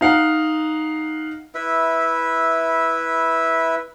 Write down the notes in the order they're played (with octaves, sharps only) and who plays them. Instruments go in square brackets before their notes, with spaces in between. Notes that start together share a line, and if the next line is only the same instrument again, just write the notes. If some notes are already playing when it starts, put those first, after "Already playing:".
[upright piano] D#4 F5 F#5 A#5
[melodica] E4 B4 E5